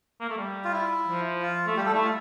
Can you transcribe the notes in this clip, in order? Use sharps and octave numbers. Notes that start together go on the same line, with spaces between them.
A#3
A3
G3
F4
E4
F3
F4
A3
G3 G4
A4
A3 E4
F4